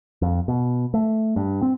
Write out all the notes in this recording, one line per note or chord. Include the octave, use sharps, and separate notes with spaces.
F2
B2
A3
G2
C4